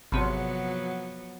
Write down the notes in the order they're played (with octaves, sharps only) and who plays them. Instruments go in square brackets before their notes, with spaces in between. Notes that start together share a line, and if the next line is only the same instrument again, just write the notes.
[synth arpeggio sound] G#1 C3 [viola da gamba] F3 F#3 B3